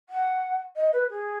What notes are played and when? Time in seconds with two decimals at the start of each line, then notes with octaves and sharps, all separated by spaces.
0.09 F#5
0.76 D#5
0.93 B4
1.10 G#4